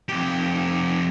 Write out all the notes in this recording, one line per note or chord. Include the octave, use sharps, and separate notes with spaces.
F2 G4